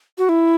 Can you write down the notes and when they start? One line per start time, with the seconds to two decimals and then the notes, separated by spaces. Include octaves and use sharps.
0.18 F#4
0.29 E4